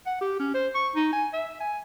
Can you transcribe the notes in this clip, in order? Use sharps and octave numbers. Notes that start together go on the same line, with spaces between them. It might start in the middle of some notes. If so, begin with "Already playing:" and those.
F#5
G4
C#4
C5
C#6
D#4
G#5
E5
G#5